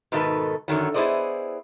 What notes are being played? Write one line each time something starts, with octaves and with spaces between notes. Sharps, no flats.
G#2 B2 D#3 E4 A4 B4
F#2 D3 D#3 F#3
B3 E4 G#4 C5 D5 D#5